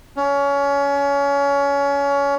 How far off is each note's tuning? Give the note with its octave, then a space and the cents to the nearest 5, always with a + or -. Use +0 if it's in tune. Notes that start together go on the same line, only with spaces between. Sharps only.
C#4 +25